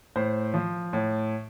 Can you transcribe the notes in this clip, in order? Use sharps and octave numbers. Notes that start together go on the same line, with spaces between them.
A2 C5
F3
A2